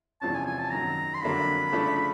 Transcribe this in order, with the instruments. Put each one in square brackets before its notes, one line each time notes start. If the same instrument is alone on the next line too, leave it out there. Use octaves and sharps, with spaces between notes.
[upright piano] E2 C3 F3 G#3 C#4 [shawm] A5
[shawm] G#5
G#5
A5
[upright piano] F#2 D#3 F#3 [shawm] A#5
[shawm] C6
[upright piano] F2 D3 F#3 A#3 D4 [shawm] B5
[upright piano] C#3 F3 A3 D4